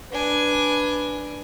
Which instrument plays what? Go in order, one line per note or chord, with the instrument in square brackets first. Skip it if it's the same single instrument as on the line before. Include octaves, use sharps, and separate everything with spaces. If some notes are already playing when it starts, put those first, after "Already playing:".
[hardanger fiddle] D4 G#5 [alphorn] B4